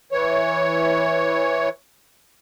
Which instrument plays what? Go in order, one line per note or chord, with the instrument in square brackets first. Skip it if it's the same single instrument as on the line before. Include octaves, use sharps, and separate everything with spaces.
[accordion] E3 C#5